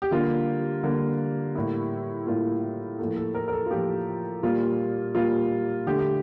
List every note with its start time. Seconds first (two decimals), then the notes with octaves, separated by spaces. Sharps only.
0.02 G4
0.11 D3 G3 A#3 F4
0.83 D3 G3 A#3
1.55 A2 G3 A#3 E4
2.27 A2 G3 A#3 F4
2.98 A2 F3 A#3 A4
3.16 A4
3.35 A#4
3.48 A#4
3.53 A4
3.66 F4
3.70 A2 F3 A#3 G4
4.43 A#2 G3 A#3 F4
5.15 A#2 G3 A#3 F4
5.86 D3 A3 G4
5.99 G4